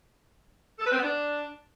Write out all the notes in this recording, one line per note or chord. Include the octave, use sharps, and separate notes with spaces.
A4
B4
C4
B3
D4